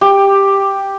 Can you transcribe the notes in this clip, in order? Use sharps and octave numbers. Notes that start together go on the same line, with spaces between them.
G4